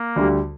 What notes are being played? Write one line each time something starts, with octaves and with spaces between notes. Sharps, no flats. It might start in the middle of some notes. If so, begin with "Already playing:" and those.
Already playing: A#3
D2 D3 G3